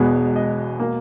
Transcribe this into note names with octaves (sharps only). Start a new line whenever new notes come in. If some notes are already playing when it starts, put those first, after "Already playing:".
Already playing: E1 E2 B2 G#3 B3
D#5
B2 A#3